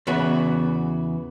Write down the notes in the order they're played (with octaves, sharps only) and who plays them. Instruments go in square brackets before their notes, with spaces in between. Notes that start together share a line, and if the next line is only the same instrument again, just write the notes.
[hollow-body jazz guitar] E2 C#3 B3 F#4